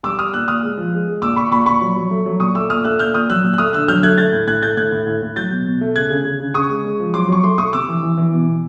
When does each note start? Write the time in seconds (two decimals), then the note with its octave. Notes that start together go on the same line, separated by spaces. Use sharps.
0.03 G3 D6 E6
0.19 G3 D#6 F6
0.33 A#2 E6 F#6
0.48 A#2 D#6 F6
0.63 G#3
0.77 F3
0.93 G#3
1.08 G#3
1.22 A#2 D6 E6
1.36 A#2 B5 C#6
1.51 A#2 B5 C#6
1.66 A#2 B5 C#6
1.81 F#3
1.96 F#3
2.11 A3
2.26 F#3
2.40 A#2 C#6 D#6
2.55 A3 D6 E6
2.70 A#2 D#6 F6
2.84 A3 E6 F#6
2.99 A#2 F6 G6
3.14 A#2 D#6 F6
3.29 F#3 E6 F#6
3.43 A#2
3.53 F#6
3.58 A3 D#6 F6
3.73 D3 E6 F#6
3.88 F#3 F6 G6
4.03 A3 F#6 G#6
4.18 A3 G6 A6
4.33 A2
4.48 A2 F#6 G#6
4.62 A3 G6 A6
4.77 A2 F#6 G#6
4.92 A2
5.07 A2
5.22 A2
5.36 F#3 G6 A6
5.51 B2
5.66 B2
5.81 A3
5.96 C#3 F#6 G#6
6.10 C#3
6.25 C#3
6.40 C#3
6.54 C#3 C#6 D#6
6.69 G#3
6.85 G#3
7.00 F3
7.14 F#3 C6 D6
7.29 F#3 C#6
7.43 A3 C6 D6
7.58 A3 C#6 D#6
7.73 C3 D6 E6
7.88 E3
8.03 E3
8.17 E3
8.32 B2
8.47 B2